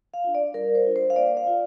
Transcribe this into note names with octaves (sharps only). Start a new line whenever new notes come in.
F5
D4 F4
D5
G3 A#4
C5
D4 F4
C5
F5
A#3 D5
F5
F4